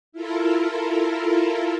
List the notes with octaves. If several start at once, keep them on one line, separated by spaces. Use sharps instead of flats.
E4 F4 A4 A#4